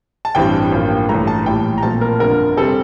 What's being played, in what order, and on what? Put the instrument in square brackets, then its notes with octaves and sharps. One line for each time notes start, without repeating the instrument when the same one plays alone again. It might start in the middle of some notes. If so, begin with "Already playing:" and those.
[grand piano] A5
A1 G2 E3 G3 C4 G5
A1 G2 F3 A#3
A1 G2 E3 A3 A#5
A5
A#1 A2 E3 G3 G5
A#5
A#1 A#2 A3 C4 A5
A#4
G1 F2 D3 A#4
C3 G3 C4 A4